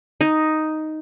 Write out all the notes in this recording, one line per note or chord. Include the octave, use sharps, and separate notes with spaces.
D#4